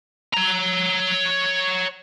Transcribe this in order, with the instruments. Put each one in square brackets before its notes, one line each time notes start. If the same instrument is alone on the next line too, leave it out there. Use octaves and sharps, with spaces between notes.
[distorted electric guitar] C#5 A#5